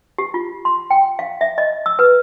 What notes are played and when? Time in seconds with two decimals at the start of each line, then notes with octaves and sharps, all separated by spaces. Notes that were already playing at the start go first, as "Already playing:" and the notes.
0.18 G4
0.34 F4
0.65 C6
0.90 G5
1.19 F5
1.41 E5
1.58 D#5
1.86 E6
1.99 B4